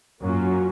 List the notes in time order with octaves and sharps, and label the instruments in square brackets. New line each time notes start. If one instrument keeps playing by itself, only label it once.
[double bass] F#2 [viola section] F#3 A#3 C#4 F4